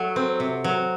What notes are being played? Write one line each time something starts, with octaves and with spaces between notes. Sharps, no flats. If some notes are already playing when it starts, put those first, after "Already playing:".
Already playing: F#3 A3
C4
C3
F#3